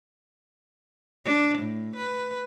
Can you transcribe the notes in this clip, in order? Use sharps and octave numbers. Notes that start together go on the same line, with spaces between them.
D4
A2
B4